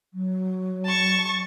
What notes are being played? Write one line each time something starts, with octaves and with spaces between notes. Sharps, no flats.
F#3
A5 C#6